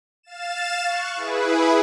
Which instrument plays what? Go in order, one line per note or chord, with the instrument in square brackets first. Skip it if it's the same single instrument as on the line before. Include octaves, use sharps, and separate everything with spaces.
[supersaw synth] F5 A6 E7
C#6 F#6
E4 G#4 B4